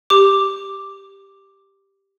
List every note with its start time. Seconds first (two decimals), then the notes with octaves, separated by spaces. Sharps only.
0.10 G4 D6